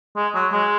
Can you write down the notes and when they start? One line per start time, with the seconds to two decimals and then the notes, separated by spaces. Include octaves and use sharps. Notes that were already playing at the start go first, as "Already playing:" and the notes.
0.16 G#3
0.34 F#3
0.52 G#3